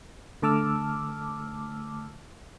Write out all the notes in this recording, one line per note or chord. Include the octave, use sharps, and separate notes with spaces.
D3 A3 A5 D6 E6 F6